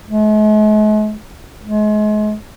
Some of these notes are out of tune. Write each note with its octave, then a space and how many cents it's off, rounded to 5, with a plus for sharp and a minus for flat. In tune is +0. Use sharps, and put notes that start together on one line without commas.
G#3 +45
G#3 +35